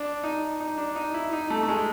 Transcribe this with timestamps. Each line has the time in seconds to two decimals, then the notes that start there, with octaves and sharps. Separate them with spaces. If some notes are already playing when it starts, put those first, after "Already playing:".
Already playing: D4
0.24 D#4
0.60 D#4
0.78 D4
0.96 D#4
1.14 E4
1.33 D#4
1.50 A3
1.63 A3
1.69 G#3